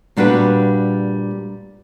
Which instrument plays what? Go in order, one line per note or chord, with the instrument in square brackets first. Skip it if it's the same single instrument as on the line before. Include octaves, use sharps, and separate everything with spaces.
[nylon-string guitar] A#2 G3 D4 F#4 B4